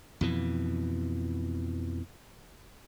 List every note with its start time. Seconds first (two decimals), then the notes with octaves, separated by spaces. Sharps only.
0.21 F2 B2 E3